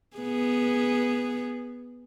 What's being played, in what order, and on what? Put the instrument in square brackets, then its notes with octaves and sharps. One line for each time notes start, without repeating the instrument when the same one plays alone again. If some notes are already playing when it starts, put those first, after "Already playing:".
[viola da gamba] B3 G#4